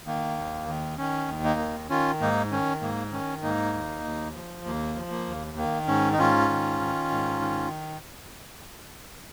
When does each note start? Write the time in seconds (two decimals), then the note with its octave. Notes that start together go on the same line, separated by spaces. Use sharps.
0.06 D#3 A#3
0.38 D#2
0.68 D#3
0.98 D#3 C#4
1.28 D#2
1.44 A#3 D#4
1.59 D#3
1.90 D#3 C#4 F4
2.20 G#2 A#3 D#4
2.52 D#3 C#4
2.81 G#2 A#3
3.12 D#3 C#4
3.43 G#2 A#3 D#4
3.73 D#2
4.04 D#2
4.34 F3
4.65 D#2 A#3
4.96 F3
5.11 A#3
5.27 D#2
5.57 D#3 A#3
5.87 G#2 C#4
6.13 D#4
6.18 G#2 C#4 F4
6.49 D#3
6.80 D#3
7.10 G#2
7.41 D#3